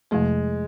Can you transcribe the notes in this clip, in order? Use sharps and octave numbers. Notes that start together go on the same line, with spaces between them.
F2 C3 F3 G#3 A3